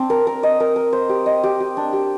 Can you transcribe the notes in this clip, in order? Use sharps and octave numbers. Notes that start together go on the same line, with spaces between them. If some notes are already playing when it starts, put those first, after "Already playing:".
Already playing: C4 D4
A#4
A#4
D#5
A#4
A#4
C5
G4
D#5
G4
G4
D4
G4